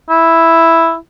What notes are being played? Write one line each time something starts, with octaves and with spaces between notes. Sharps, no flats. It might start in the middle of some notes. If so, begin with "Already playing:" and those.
E4